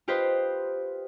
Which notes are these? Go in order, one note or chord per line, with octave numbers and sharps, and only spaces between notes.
F4 G4 B4 C5 D#5